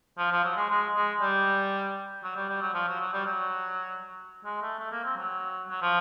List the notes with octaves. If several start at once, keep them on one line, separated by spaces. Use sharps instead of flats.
F3
F3
F#3
G#3
G#3
G#3
G3
F#3
G3
G3
F#3
F3
F#3
F#3
G3
F#3
G#3
A3
A3
A#3
C4
F#3
F#3
F3